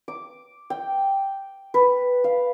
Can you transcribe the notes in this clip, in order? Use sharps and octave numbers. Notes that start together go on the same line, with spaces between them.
D6
G5
B4
F5